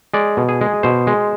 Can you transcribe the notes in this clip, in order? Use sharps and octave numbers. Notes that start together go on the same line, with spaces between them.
G#3 D5
B2
G#4
G#3
B2 C5
G#3